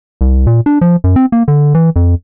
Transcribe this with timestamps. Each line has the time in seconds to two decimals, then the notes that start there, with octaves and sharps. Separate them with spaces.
0.21 C2
0.47 A#2
0.66 D4
0.81 F3
1.04 F#2
1.16 C4
1.32 A#3
1.48 D3
1.75 E3
1.96 F2